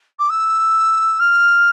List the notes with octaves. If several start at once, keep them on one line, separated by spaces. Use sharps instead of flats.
D6
E6
F6